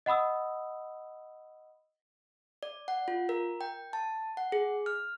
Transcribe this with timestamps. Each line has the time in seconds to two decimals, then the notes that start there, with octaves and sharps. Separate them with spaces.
0.06 D#5 F#5 B5 D#6 E6
2.63 D5
2.88 F#5
3.08 F4
3.29 A#4
3.61 G5
3.93 A5
4.37 F#5
4.52 G#4
4.86 F6